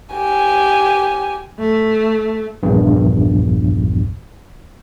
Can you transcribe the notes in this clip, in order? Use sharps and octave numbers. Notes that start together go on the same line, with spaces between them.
G4 G#5
A3
A#1 E2 G2